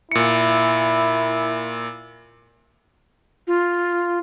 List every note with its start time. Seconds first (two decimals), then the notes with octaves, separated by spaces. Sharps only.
0.12 A#2 E4 C#7
3.47 F4